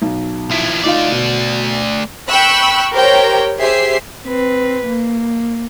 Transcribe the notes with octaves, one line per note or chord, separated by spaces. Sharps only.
B1
F3 E4
A3 D#4 F4 D5 F5
B2
G5 B5 C#6 E6 F#6
G4 A#4 C5 C#5 G5 A#5
G4 G#4 C5 E5 C7
C4 B4
A#3